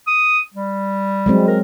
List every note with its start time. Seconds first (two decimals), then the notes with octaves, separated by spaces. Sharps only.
0.07 D#6
0.54 G3
1.26 F#3 G#3 C4
1.48 A#4